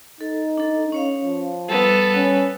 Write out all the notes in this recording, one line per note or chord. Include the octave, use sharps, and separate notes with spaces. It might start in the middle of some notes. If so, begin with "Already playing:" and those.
D#4 A4
D4 A4
C#4 C#5 F5
F3
G3 B3 A4
C#4